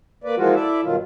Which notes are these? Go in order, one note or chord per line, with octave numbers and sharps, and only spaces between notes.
A#3 B4 D5
E3 F3 G#3 A#3 F4 F#4
E4 A4 D5 E5
G2 B2 D#3 F#3 F4